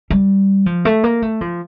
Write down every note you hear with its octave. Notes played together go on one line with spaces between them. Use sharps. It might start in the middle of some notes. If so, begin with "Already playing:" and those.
G3
F3
A3
A#3
A3
F3